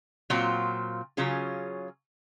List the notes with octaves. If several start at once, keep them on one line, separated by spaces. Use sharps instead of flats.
A#2 F#3 C4 F4
C#3 F#3 C#4 F4 G#4